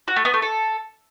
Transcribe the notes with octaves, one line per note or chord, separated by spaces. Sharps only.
F#4
A3
B3
A3
A4